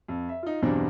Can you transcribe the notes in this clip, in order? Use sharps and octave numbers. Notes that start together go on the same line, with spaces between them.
F2
E5
D#4 F4
E2 G2 B2 F#3 C4 D4